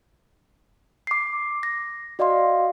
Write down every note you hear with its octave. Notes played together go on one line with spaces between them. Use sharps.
D6 C7
A#6
F#4 D5 D#5 F5 C6